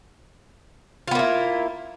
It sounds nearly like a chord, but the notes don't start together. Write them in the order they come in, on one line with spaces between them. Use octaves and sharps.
F4 B3 A#3 E4